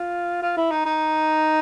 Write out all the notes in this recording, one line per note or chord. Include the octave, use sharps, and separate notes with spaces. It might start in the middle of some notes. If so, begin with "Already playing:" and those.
Already playing: F4
F4
E4
D#4
D#4